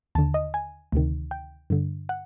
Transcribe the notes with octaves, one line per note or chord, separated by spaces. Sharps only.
D#2 D3 A5
D#5
G#5
D2 C3 D#3
G5
G2 D3
F#5